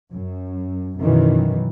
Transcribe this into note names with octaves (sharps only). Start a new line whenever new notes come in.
F#2
F#2 B2 D#3 E3